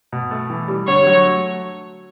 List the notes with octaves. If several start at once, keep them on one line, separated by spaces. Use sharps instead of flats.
B2
A3
E3
G3
D3 C#5
F#3
A3